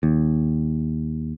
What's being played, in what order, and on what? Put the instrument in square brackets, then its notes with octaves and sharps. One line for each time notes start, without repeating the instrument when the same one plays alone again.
[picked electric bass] D#2